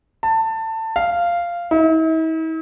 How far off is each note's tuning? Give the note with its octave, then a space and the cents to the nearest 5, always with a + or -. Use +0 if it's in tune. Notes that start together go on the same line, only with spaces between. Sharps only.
A5 +20
F5 -10
E4 -45